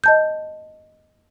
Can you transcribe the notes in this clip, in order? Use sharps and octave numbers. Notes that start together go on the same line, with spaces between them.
D#5 A5 G6